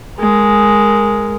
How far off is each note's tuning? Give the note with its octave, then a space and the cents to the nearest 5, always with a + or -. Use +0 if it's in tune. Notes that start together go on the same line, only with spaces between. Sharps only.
G#3 +0 A#4 +0